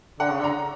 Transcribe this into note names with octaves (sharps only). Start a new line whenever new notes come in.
D3 F#5
C#3
D3
A#5